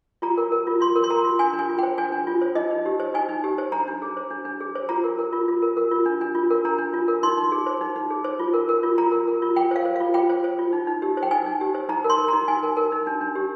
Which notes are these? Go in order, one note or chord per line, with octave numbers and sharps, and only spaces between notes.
F4 A#5
A#4
A#4
F4
F4 C6
A#4
C6
A#4 A#5
F4
D4 G#5
D4
G#5
F4
C5 G5
D4 G#5
D4
F4
C5
D#4 D#5
D#4
G4
C5
D#4 G#5
D#4
G4
C5
D4 A#5
D4
G#4
C5
D4
D4
G#4
C5
F4 A#5
A#4
A#4
F4
F4
A#4
A#4
F4
D4
D4
F4
A#4
D4 A#5
D4
F4
A#4
D#4 C6
D#4
G#4
C5
D#4
D#4
G#4
C5
F4
A#4
A#4
F4
F4 A#5
A#4
A#4
F4
F4 G5
C5 F5
C5
F4 F5
F4 G5
C5
C5
F4
D#4
D#4
G4
C5
G5
D#4 G#5
D#4
G4
C5
D#4 A#5
A#4
C6
A#4
D#4 A#5
D#4 G#5
A#4
A#4
D#4
D4
D4
G4